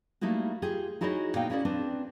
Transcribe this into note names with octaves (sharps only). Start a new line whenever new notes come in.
G3 A3 A#3 D#4 E4 F#4
F4 G4 G#4
D#4 E4 F#4 G#4 C#5 D#5
A#2 B3 D#4 F5 G5
C#4 E4 F#4 G#4 D5
C4 D4 B4